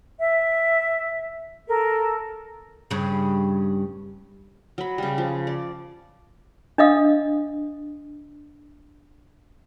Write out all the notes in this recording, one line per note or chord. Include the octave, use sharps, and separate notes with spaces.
E5
A4 A#4
G2 C#3
F#3 B5
C#3 G3
F3
D5
D4 D#5 F5 D#6